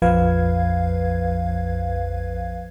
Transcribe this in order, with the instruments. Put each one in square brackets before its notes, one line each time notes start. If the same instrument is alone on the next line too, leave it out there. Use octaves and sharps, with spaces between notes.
[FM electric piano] A#1 F2 F3 B4 F5 G#6